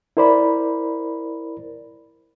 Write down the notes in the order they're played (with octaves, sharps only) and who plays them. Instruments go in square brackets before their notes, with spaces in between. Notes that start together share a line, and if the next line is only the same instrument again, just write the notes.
[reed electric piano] E4 A#4 C5 D5 B5